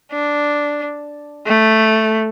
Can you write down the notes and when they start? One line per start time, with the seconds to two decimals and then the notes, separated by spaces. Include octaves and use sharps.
0.12 D4
1.47 A3